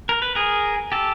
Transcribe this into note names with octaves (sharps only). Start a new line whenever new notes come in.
A#4
B4
G#4 A#4
G4 A4